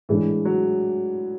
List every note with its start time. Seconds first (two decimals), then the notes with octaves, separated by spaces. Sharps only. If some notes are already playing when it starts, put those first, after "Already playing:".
0.09 A2 E3 G#3 D4
0.45 F#3